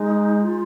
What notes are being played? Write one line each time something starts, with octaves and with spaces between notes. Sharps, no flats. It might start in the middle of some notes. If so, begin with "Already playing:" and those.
Already playing: G#3 D#4
F4